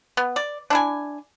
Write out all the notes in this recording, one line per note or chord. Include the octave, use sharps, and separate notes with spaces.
B3
D5
D4 E4 G#5